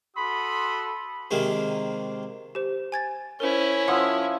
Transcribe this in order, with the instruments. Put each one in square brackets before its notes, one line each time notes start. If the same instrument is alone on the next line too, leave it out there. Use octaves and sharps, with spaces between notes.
[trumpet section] F#4 A4 B5 C6 D#6
[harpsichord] C3 D#3 G#3 A#3
[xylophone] G4 C5
G#5 G#6 A6
[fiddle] C#4 E4 [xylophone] A#4 C5
[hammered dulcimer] F3 E5 [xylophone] F#5 C6 D#6